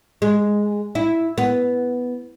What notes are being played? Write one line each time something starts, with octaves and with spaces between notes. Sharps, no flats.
G#3
E4
B3